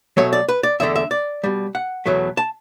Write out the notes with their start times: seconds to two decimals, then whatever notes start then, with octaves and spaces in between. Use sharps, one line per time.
0.17 B2 F#3 A3 C#5
0.33 D5
0.49 B4
0.63 D5
0.80 E2 D3 A3 E5
0.96 E5
1.11 D5
1.44 B2 G3
1.75 F#5
2.06 E2 B2 F#3 A3
2.37 A5